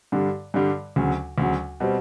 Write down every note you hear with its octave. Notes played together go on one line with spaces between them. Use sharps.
G2 D3 G3
G2 D3 G3
D2 C#3 F#3
D2 C#3 F#3
B2 G3 C4